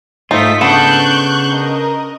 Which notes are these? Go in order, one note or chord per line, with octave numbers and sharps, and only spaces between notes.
G#2 A3 D#4 F4 C5 B6
C#3 B3 D4 A4 C#6 F#6 G6
A#4 D#5